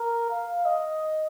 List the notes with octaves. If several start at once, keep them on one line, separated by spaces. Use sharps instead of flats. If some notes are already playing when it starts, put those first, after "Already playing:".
Already playing: A#4
F5
D#5